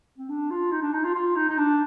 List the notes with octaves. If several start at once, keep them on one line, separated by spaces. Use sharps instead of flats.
C4
D4
F4
D#4
D4
D#4
F4
F4
D#4
D#4
D4